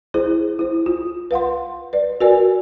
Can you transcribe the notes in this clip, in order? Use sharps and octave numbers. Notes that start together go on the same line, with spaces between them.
E4 G#4 C5
E4 C5
F4
B4 F5 F#5 C6
B4 D5
F#4 A#4 B4 D5 G#5